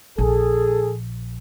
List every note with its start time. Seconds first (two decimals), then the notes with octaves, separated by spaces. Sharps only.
0.18 A#1 G#4 A4